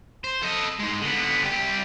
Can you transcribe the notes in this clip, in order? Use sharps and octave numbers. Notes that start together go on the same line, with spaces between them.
C5
A4 D#5
G#2 G#3
D3 B3
C2 G4